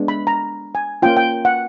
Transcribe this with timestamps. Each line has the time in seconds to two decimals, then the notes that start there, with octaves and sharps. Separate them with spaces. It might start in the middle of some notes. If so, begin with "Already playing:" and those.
Already playing: G#3 B3 D4
0.08 B5
0.27 A#5
0.75 G#5
1.02 A#3 C#4 F4 G5
1.17 G5
1.45 F#5